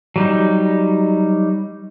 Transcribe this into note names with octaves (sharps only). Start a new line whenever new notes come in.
F#3 G3 D#4